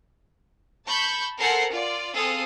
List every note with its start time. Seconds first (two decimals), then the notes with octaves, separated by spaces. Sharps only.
0.87 A5 B5 C#6 G6
1.39 A4 A#4 C5 F#5 G#5 C7
1.71 F4 D5
2.14 C4 G#4 A4 F5 D#6